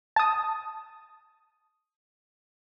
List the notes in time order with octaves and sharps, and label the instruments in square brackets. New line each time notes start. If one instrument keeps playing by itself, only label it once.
[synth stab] A5 D#6